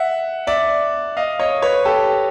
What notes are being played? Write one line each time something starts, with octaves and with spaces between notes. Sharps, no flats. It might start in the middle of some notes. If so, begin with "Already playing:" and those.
Already playing: E5 F#5
D5 E5
D#5 F5
C#5 D#5
B4 C#5
G4 A4